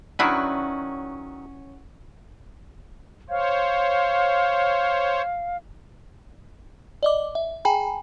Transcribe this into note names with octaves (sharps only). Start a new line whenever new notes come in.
D#3 F#3 C#4 D4 E4 F#4 B4
C5 C#5 F5
D5 D#5 D6
E5
G#4 G5 G#5 A#5 B5